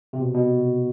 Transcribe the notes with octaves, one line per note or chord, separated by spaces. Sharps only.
C3
B2
B2